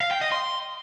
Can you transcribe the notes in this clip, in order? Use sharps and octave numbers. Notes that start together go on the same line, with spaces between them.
F5
G5
D#5
C6